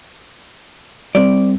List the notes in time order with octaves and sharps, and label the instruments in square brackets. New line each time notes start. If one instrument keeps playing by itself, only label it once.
[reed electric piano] G3 C4 [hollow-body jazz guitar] D5